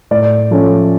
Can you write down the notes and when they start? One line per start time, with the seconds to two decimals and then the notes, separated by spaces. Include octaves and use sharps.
0.11 A2 D5
0.51 F3 A3 C#4